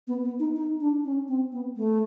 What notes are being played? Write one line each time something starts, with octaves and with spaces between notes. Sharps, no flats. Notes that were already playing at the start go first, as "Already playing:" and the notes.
B3
B3
D#4
D#4
D4
C#4
C4
B3
A3